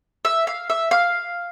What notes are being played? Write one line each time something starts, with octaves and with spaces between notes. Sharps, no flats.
E5
F5
E5
F5